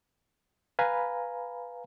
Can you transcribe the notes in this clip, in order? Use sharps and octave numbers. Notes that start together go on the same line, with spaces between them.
B4 F5 G#5 A#5 B5